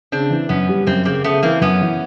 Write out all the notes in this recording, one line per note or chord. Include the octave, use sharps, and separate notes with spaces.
C#3 C4 D4
E3
F#2 B3 C#4
G3
F#2 A#3 C4
C#3 A#3 C4
C#3 A3 B3
E3 A#3 C4
F#2 B3 C#4
E3